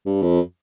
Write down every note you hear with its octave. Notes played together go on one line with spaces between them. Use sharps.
G2
F2